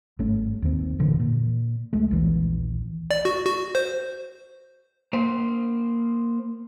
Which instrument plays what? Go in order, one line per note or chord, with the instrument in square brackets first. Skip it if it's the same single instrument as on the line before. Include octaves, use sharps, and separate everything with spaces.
[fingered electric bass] G#1 G2 A3 C#4
D#2 D#3 C4
F#1 A#2 D3 E3
A#2
C#2 G#3 A3
A#1 D#2 A#2 E3
[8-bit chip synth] D5
F#4
F#4
C5
[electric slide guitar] A#3 C5